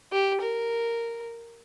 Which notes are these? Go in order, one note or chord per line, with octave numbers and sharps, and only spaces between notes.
G4
A#4